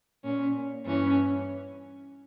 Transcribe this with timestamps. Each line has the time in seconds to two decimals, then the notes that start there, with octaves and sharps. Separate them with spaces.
0.24 A#2 C#4
0.86 G2 E3 C#4